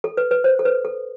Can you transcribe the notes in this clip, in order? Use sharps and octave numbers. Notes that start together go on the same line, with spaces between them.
A4
B4
B4
C5
A4
B4
A4